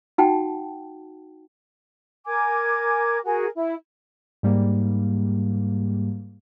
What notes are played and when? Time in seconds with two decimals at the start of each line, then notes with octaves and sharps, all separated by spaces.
0.18 D#4 F#4 F#5 G5 A5
2.26 A#4 G#5 D6 G#6
3.25 F#4 G#4 A#4 G#5
3.56 E4
4.43 G#2 G3 A#3